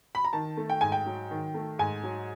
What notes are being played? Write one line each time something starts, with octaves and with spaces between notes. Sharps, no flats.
B5
A#5
D#3 A5
A3
G5
G#2 G#5
G5
F#3
D#3
A3
G#2 G#5
F#3